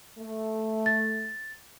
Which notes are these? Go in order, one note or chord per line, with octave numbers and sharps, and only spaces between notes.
A3
A6